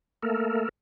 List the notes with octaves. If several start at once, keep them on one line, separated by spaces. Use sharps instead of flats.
A3 A#3 A4 A#4